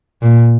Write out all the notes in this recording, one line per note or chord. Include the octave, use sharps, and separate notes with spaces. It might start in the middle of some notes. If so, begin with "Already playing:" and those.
A#2